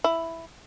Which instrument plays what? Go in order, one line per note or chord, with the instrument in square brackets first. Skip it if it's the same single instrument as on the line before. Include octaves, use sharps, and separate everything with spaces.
[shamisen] E4